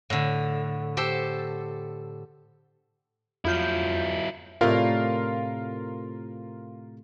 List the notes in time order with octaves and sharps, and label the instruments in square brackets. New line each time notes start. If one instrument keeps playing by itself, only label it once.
[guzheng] A2 D3
G4 A4 C5
[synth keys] F2 F4 G6 [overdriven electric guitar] F#3 E4
[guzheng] A2 C3 D5 [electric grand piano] F4 A#4 F5